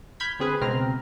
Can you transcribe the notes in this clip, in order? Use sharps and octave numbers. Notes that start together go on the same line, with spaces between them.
B5 F6 G6 G#6 B6
D3 C4 G#4 B4
C#2 B2 C4 A#5 F6